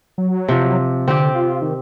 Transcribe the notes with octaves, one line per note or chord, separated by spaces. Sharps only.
F#3
C3 F3
D3 C4 G4
F4
D#3